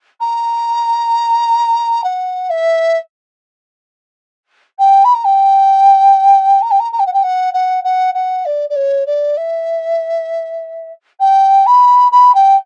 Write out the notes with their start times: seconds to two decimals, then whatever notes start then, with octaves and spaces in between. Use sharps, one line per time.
0.20 A#5
2.04 F#5
2.49 E5
4.78 G5
5.04 B5
5.14 A#5
5.24 G5
6.61 A#5
6.70 G5
6.79 A#5
6.92 A#5
6.99 G5
7.06 F#5
7.13 G5
7.23 F#5
7.53 F#5
7.84 F#5
8.14 F#5
8.45 D5
8.69 D5
8.75 C#5
9.06 D5
9.37 E5
11.20 G5
11.66 B5
12.12 B5
12.34 G5